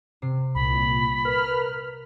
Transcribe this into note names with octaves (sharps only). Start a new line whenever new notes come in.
C3 C7
C2 A#2 B5
A#4 B4 F6